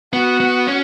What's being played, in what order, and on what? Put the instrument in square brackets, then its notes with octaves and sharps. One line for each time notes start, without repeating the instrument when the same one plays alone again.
[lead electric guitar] B3 [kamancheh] F#4
[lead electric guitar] B3
C#4